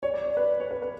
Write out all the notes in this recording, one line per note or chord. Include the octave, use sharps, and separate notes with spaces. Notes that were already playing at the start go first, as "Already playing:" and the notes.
C#5 D5
D5
C#5
B4 D5
C#5
B4
B4